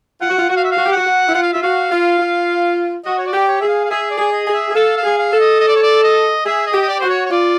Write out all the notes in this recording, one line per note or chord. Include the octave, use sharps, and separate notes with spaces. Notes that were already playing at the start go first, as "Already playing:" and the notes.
F4 F#5
F#4
F4
F#4 F#5
F5
E5
F5
F#4
G4
F#4 F#5
F#4
E4
F4 F#5
F5
F4 E5
F#4 F5
F4
F4
F#4 D#5
C#5
D5
G4
C#5
G#4 E5
F5
F5
G#4 E5
D5
G#4
D#5
G#4
E5
G#4
A4 F5
F5
G#4
F5
A4
D#5
D#5
D5
C#5
D5
D#5
G#4 E5
D#5
G4
D#5
D5
F#4 C5
C#5
C#5
F4 D5